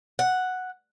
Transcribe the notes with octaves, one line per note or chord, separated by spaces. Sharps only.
F#5